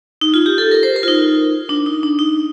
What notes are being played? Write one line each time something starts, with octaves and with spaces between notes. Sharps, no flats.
D#4
F4
G4
A4
A#4
C5
A#4
F4
D#4
D4
D#4
D4
D#4